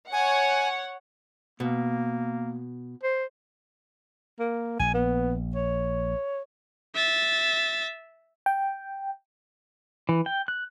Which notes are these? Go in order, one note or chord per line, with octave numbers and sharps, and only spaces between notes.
C#5 F#5 G#5
B2 A#3
C5
A#3
A#1 G#5
B3
C#5
E5 A6
G5
E3
G5
F#6